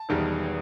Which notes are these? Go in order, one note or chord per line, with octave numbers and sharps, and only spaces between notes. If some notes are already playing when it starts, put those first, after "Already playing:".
Already playing: A5
E1 E2 D#3 G3